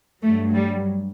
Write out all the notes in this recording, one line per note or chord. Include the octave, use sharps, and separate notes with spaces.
G2 F#3 A3
G3